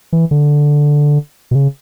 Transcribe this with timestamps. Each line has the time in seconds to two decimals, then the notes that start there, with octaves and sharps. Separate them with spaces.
0.13 E3
0.31 D3
1.51 B2
1.55 C#3